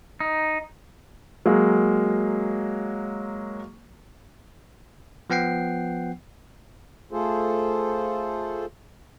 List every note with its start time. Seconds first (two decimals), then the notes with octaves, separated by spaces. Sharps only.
0.20 D#4
1.46 F#3 G#3 A#3
5.30 F3 B3 F#5 G5 C7
7.11 A3 F4 G#4 A4 C5